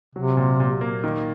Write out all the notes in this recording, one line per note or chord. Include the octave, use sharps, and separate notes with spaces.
C3 F#3
A#2
A#2
A#3
D#3